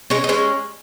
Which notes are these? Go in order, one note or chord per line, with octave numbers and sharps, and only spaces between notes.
G#3 C#4
D#4
G#3 C#4